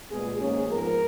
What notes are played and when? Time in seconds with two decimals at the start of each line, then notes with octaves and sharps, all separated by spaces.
0.11 A#2 G#3 B3 G#4
0.39 G#2 D#3 A#3 C#4 G#4
0.67 G#2 F3 G#3 B3 A#4